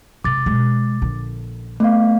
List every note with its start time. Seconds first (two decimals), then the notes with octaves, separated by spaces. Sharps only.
0.24 E1 C3 D6 A6
0.46 B2 G#3
1.02 A#1 D3
1.80 A3 B3 F5